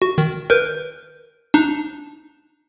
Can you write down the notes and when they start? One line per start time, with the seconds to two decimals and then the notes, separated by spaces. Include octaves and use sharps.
0.02 F#4
0.18 D#3
0.50 A#4 B4 G6
1.54 D4 D#4